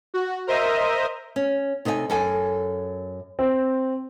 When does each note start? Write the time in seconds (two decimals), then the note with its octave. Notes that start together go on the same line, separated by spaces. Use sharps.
0.14 F#4
0.47 A#4 C5 D#5 E5 D#6
1.36 C#4
1.85 C3 D#4 A4 D#5 G#5
2.10 F#2 A4 G#5
3.39 C4